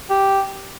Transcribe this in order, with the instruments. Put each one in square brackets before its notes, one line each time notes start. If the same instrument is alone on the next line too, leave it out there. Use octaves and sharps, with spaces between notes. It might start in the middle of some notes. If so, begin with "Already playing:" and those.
[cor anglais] G4